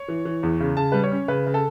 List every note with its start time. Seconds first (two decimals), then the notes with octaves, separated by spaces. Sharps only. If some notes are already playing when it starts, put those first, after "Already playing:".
Already playing: C#5
0.08 E3
0.25 E3
0.43 E2
0.60 C#3
0.77 C#3 A5
0.92 G3 B4
1.04 C#5
1.12 C#4
1.28 C#3 B4
1.46 C#3
1.54 A4